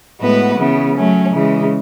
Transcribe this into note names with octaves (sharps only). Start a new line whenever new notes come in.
A2 G#3 B3 F#4 B4
C#3 E3 B3
F#3 A3 C#4
C#3 E3 G#3